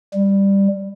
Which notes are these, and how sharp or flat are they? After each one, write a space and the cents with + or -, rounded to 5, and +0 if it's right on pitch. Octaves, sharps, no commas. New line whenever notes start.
G3 +10